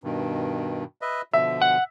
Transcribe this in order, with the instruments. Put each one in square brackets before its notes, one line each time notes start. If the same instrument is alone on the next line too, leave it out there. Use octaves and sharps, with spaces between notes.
[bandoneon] G2 B2 D#3
B4 D#5 E5
[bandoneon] B2 D3 F3 [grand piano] E5
[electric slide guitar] F#5